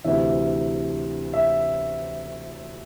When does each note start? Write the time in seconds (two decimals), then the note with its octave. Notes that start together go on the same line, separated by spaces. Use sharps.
0.04 D2 C3 E3 E5
1.33 E5